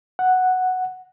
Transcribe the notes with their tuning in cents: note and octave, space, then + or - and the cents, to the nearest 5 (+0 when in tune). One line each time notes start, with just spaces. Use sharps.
F#5 +0